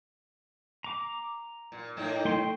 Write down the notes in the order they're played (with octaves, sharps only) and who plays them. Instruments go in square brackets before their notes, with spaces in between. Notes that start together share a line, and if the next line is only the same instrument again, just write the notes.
[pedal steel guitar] A#5 D6
[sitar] A#2
A2 A#3 D#4
[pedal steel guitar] A3 G5 C6